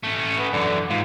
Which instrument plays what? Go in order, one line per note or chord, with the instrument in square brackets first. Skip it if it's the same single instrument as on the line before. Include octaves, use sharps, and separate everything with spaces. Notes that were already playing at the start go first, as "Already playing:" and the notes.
[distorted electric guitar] A3 C#4
[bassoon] B3
[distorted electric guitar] F#2 E3 [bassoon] D3
[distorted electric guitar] G#2 [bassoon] F4